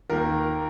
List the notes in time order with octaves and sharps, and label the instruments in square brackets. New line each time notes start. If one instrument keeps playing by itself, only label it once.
[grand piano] D#2 D#3 A#3 A#4